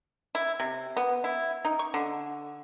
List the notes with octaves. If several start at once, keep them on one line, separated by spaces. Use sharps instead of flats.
E4
C3
B3
E4
D#4
C#6
D3